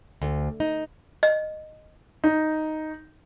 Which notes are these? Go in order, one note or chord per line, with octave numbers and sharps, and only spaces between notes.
D2
D#4
D#5
D#4